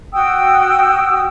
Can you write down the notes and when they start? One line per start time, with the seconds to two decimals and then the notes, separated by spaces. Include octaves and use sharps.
0.13 F#4 G5 D#6 E6